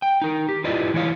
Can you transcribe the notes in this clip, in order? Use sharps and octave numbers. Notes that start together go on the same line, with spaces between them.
G5
D#4 A#4
G4
E4 F4 G4 B4 D5 D#5
E3 E4 C#5 F5